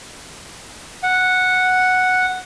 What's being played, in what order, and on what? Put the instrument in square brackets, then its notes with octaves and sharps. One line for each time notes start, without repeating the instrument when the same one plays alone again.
[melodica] F#5